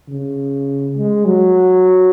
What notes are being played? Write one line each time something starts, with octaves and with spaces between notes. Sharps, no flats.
C#3
G#3
F#3